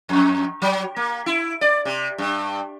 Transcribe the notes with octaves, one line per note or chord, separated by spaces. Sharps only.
F2
F#3
A#3
E4
D5
C3
G2